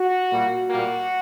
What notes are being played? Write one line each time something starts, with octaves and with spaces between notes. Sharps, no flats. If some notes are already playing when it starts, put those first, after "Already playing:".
Already playing: F#4
A#2 G3 A#3
A#2 G3 A#3 F#4